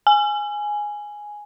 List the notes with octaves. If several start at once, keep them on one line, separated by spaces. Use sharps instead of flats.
G#5